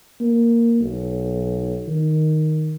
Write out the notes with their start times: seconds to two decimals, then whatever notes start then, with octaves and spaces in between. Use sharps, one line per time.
0.21 A#3
0.81 B1
1.88 D#3